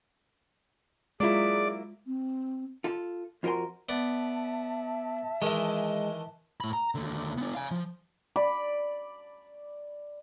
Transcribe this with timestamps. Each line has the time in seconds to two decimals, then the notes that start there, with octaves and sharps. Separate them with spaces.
1.20 F#3 G#3 A#3 E4 F4 G#4 D5
2.07 C4
2.84 F4 A4
3.43 F2 F4 F#4 A#4 G#5 C6
3.89 B3 D5 E5 A5
5.42 D#3 E3 G#3
6.61 A2 B5
6.73 A#5
6.95 D#2 D3
7.37 B3 D4
7.55 F5 G#5
7.71 F3
8.36 D5 B5